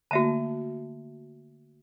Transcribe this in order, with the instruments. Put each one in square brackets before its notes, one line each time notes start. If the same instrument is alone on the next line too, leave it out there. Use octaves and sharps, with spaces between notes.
[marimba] D3 A3 A#3 [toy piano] F#4 E5 A5